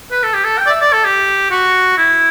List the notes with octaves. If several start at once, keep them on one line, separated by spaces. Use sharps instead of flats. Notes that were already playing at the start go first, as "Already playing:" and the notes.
B4
A4
G4
A4
G5
D5
E5
D5
A4
G4
F#4
E4